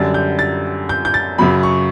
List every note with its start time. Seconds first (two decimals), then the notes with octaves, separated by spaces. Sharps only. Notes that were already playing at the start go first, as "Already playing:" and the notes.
Already playing: F#2 D3 G3 A6
0.14 G6
0.39 A6
0.89 G6
1.05 G6
1.14 A6
1.38 F#2 C#3 F#3 B5
1.63 C#6